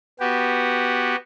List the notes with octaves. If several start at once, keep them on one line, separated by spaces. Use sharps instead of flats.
B3 F#4 G4